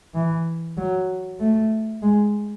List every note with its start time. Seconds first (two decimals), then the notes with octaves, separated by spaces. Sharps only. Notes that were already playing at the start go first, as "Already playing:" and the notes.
0.15 E3
0.77 F#3
1.40 A3
2.02 G#3